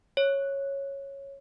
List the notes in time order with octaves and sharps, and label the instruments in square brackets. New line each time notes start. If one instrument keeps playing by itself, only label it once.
[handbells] C#5